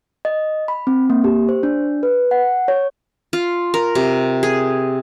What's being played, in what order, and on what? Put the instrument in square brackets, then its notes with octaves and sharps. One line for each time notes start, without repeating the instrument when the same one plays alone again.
[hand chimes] D#5
B5
C4
A#3
G4
C5
D4
B4
F#5
C#5
[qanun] F4
A#4
C3
G#4